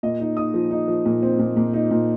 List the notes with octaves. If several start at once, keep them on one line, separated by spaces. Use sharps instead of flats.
A#2 D#5
D#4
D#4 D#6
F3
D#4
F3
A#2
C4
A#2
A#2
D#4
A#2